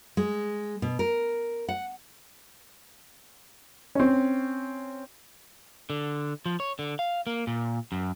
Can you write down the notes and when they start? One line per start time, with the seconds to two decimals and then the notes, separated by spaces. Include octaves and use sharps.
0.17 G#3
0.82 B2
0.99 A#4
1.68 F#5
3.95 C4 C#4
5.90 D3
6.46 F3
6.60 C#5
6.79 D3
6.99 F5
7.27 A#3
7.47 A#2
7.92 F#2